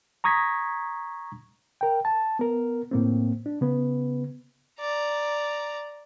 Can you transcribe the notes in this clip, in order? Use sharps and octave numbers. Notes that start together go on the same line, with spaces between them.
A#5 C#6 D#6 G#6 A#6 B6
A#4 G5
A5
B3 A#4
A2 A#3 C4
D4
C#3 B3 B4
D5 A#5